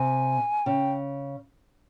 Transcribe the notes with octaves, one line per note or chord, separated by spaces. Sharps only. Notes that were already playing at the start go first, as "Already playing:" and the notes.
Already playing: C3 G#5
C#3 G5